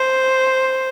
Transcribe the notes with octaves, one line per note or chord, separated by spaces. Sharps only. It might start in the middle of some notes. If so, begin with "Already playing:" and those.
Already playing: C5